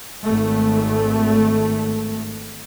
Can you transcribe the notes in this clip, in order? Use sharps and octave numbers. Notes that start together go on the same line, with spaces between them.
G#1 A3